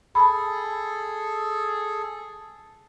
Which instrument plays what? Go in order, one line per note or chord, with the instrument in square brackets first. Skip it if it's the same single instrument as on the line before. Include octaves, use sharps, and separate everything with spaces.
[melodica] G#4 A4 [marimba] A5 B5